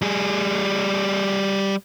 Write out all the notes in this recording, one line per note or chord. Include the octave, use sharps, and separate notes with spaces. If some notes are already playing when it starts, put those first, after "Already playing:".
G3 G#4